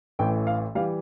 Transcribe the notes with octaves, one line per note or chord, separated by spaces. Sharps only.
A1 A2 E3 G5
F5
E3 G3 F5